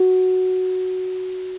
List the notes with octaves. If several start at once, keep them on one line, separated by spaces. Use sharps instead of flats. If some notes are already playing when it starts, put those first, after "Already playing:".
Already playing: F#4